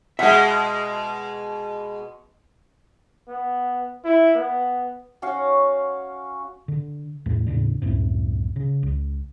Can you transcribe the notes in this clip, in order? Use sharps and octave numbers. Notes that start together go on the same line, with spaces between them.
B2 G#3 E5 F#5
B3
E4
B3
C#4 F#4 C#5 F5
D3
E2 A2 A3
D#2 A2 C#3 D4
C#2 F#2 A2 C3
C#3
C#2